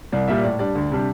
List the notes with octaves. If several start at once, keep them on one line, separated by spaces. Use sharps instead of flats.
C2 D5
A#2 G3 E5
A2 D5
G3 D4 D5
D2
C3 G3 D4